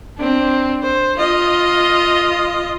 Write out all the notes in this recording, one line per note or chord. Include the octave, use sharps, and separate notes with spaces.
C4 D4
C5
F4 D#5